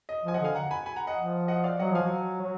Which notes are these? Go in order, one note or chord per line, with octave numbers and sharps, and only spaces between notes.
D#5
F3 G#5
D#5 F#5
D3 F5 G#5
F#5 A#5
G#5 B5
G#5 B5
F#5 A#5
D#5 F#5
F3
D#5 F#5
D5 F5
F#3 D#5 F#5
F3 F5 G#5
F#3
F#3